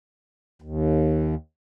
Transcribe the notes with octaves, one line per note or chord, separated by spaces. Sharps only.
D#2